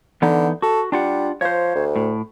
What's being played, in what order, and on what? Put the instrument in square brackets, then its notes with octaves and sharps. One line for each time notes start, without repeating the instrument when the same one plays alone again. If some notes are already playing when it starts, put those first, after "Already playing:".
[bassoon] D3 [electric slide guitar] E3 B3 D#4
[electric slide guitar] F#4 [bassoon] A4
[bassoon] G3 [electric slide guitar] D4 F4 F#5
[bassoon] F3 [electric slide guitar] C5 C#5
[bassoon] D2
[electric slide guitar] A2